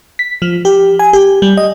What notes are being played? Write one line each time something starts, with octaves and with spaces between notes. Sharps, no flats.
B6
F3
G4
G#5
G4
G3
D#5